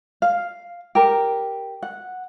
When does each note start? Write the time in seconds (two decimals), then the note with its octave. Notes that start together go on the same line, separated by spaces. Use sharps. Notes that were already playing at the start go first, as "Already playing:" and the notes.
0.22 F5
0.95 G4 A#4
1.83 F#5